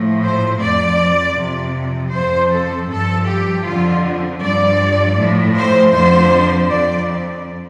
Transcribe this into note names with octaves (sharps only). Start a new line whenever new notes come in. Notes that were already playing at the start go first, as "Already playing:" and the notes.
Already playing: A2 F3
C5
F2 F3 D5
F2 C3 F3
F2 F3 C5
A4
G2 F3 A4
G4
F2 D3 F3 F4
G2 F3 D5
A2 F3
C5
F2 D3 F3 C5
F2 F3 D5